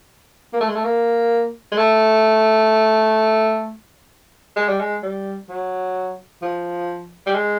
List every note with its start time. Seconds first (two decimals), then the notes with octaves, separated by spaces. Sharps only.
0.53 A#3
0.60 A3
0.68 G#3
0.75 A3
0.84 A#3
1.72 G#3
1.77 A3
4.56 G#3
4.69 G3
4.80 G#3
5.03 G3
5.49 F#3
6.42 F3
7.26 G3
7.35 G#3